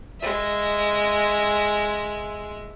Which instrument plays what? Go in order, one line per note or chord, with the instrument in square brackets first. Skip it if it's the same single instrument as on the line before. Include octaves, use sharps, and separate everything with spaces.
[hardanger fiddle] G#3 E5